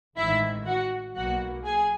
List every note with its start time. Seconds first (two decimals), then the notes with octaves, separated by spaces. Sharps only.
0.17 A1 G#2 D#3 E4 E5
0.66 F#4 F#5
1.15 B1 B2 F#3 A#3 F#4 F#5
1.64 G#4 G#5